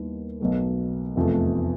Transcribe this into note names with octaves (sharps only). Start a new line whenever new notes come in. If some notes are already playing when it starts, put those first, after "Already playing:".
Already playing: D#2 D#3 G3 B3 E4
B1 B2 F#3 A3
F1 E2 C3 F3 A3